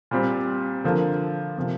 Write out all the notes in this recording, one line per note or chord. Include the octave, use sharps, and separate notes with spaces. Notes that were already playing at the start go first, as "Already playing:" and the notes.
A#2 G3 C4 G4 C5
D3 F3 A#3
C3 F3 A#3